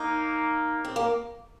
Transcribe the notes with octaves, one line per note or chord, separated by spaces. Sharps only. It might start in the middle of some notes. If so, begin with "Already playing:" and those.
Already playing: A#3 D#4
C4
A#3